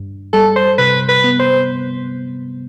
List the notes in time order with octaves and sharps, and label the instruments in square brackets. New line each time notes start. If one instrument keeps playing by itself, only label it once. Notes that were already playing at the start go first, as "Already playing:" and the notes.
Already playing: [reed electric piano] G2
[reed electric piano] G3 [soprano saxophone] A4
[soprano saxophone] C5
[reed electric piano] C3 [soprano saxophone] B4
[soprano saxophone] B4
[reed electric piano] B3
[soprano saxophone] C5